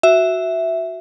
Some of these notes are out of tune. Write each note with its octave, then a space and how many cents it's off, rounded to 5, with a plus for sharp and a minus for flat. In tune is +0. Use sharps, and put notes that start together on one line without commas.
F#4 +0 E5 +0